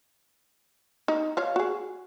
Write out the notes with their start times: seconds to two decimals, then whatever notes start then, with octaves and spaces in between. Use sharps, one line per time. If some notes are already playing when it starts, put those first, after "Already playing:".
1.08 D#4
1.37 F4 C#5 F5
1.56 F#4 G#4